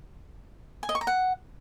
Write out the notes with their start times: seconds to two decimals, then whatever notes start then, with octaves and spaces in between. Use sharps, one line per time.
0.83 G#5
0.89 D#5
0.95 C#6
1.01 A#5
1.07 F#5